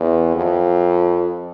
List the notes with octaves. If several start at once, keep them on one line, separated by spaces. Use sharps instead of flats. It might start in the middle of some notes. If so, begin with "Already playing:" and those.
Already playing: E2
F2